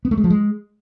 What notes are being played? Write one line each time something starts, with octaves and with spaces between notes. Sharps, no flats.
B3
A3
G#3
F3
G#3